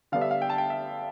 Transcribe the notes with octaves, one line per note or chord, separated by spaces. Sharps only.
D3 G3 B3 D4 F5
E5
F5
G5
A5
G5
E5